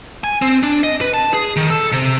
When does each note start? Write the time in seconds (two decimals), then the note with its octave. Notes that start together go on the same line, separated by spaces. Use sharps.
0.24 G#5
0.42 C4
0.63 D4
0.83 D#5
1.01 B4
1.14 A5
1.33 G#4
1.56 D#3
1.70 A4
1.92 C3